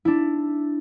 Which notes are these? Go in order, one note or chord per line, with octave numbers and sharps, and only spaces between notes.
D4 E4